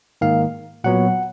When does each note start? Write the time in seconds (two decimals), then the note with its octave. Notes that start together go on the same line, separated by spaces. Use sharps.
0.21 G#2 D#3 A#3 F5
0.84 A#2 F#3 B3 F#5